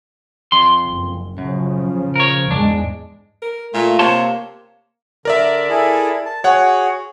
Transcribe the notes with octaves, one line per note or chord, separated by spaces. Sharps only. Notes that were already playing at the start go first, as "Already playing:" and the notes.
F2 C6
F#1
F#2 C#3 F3
A#4 C#5
E2 G#2 G#3 D4
A#4
A#2 A3 F4
C3 A#3 C#5 A5 C6
D3 A#4 D5 E5
E4 G#4 A4
A5
F#4 G#4 C#5 F#5